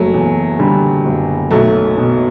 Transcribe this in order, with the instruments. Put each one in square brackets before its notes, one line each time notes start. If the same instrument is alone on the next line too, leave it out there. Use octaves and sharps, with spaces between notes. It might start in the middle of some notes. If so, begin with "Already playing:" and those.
Already playing: [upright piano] F#1 F#3 A3
E2
D3 G3
F#1
B1 F#3 A3
B2